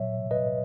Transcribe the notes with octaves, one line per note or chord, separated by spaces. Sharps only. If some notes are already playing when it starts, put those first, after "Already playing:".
Already playing: A#2 F#3 C#5 E5
B4 D#5